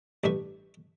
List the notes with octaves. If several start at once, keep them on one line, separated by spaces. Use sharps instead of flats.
A1 G2 E5 C#6